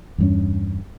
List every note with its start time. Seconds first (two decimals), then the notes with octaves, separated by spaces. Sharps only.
0.18 E2 G2 C#4